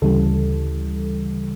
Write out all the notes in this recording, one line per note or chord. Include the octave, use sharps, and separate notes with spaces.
D2 C#3 E3 G3 A4